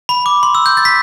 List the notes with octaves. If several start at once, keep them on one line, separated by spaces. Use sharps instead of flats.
B5
D6
C6
E6
G6
A6
B6